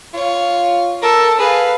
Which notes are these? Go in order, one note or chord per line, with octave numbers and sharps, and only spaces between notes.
F4 C#5
A4 A#4
G#4 B4 F5